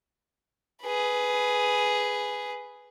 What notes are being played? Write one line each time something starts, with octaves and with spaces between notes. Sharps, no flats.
G#4 B4